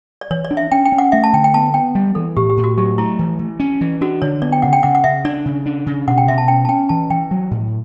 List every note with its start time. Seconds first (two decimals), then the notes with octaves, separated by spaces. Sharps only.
0.21 D5
0.30 E3 C#5
0.45 D5
0.51 D4
0.57 E5
0.72 C#4 G5
0.85 G5
0.92 C#4
0.98 F#5
1.12 A3 E5
1.24 A5
1.33 D3 G5
1.44 G5
1.54 B3 A5
1.74 B3 G5
1.95 G3
2.15 E3 A4
2.36 A2 G4
2.50 G4
2.57 A2
2.64 F#4
2.77 F#3 G4
2.98 A3 E4
3.19 E3
3.39 E3
3.60 C#4
3.81 E3
4.01 D4 F#4
4.22 D3 C#5
4.42 B3 D5
4.52 G5
4.62 C#3 F#5
4.73 G5
4.83 C#3 F#5
4.95 F#5
5.04 C#3 E5
5.25 D4 D5
5.46 C#3
5.66 D4
5.86 C#3
6.07 B2 F#5
6.18 G5
6.28 B2 E5
6.38 A5
6.48 C#4 G5
6.65 A5
6.69 C#4 G5
6.89 E3 A5
7.10 E3 G5
7.31 F#3
7.51 A2